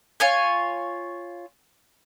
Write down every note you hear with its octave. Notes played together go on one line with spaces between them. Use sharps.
F4 C#5 G#5